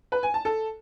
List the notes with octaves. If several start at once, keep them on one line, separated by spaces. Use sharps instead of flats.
B4
G#5
A5
A4